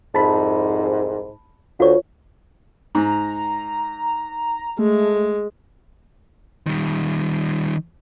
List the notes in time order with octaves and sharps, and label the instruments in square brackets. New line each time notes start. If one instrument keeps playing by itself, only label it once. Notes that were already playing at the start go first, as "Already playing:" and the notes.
[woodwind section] C2 F2 G#2 [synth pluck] A5 B5
[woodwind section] D2 [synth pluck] F4 C#5
[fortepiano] G#2 [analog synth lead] A#5
[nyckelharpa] G#3 [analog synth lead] A3
[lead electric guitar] D#3 G3